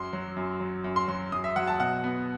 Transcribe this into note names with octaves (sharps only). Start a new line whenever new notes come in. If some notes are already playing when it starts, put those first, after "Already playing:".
Already playing: F#2 C6
F#3
F#2
F#3
F#2
C6
F#3 C6
F#2 D#6
E5
F#3 F#5
A5
B2 F#5
B3